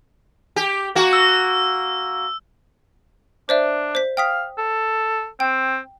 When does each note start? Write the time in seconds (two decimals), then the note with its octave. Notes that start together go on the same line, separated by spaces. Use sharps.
0.56 G4
0.95 A#3 F#4
1.13 E6
3.49 D4 C5 D5 E5
3.95 C5 B6
4.17 F5 G5 D#6 B6
4.58 A4
5.40 C4 G5